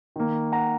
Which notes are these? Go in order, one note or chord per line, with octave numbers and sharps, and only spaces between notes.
D#3 A#3
F#5 A#5